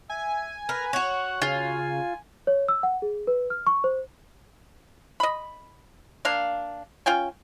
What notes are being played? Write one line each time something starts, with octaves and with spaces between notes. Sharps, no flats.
E5 G#5
A#4 B4
F#4 C#5 F#5
C#3 F4 G#5
C#5
E6
F#5
G#4
B4
F6
C#6
C5
D#5 B5
A#3 D4 F5
C#4 F4 G5 G#5